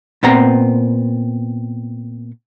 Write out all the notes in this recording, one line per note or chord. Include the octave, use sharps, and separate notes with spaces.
A#2 B3 C4 A#5